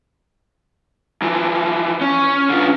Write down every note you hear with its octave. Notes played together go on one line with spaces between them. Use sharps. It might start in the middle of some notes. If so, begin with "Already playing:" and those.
E3 F3
C#4
D3 F4